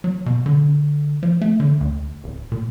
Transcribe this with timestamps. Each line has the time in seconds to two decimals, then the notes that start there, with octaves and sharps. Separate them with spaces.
0.04 F#3
0.26 B2
0.46 D3
1.23 F3
1.41 A3
1.60 D3
1.81 D2
2.24 D1
2.52 A#2